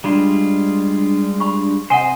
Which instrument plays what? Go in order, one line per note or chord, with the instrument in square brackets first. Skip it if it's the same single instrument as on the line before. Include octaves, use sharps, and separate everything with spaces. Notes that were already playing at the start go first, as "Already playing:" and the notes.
[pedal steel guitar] G3 G#3 F4 [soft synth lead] D4
[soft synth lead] D4 [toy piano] B5 C#6
[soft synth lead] C3 [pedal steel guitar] C5 D#5 [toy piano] F#5 G#5